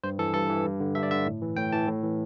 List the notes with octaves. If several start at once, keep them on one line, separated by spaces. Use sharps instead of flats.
G2 C5
E3 A4
G2 A4
E3
G2
D3
G2 E5
D5
D3 E5
A2
E3
A2 G5
E3 A5
A2
E3